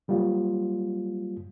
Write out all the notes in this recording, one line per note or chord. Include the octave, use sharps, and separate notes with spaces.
F#3 G3 A#3 F4